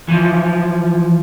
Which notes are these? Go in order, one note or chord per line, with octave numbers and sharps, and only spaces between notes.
E3 F3